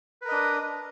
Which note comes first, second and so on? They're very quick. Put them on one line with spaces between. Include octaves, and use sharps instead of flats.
B4 A#4 D#5 D4